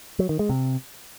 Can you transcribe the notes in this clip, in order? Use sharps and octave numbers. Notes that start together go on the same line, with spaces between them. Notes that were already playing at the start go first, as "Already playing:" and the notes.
F#3
D#3
G#3
C3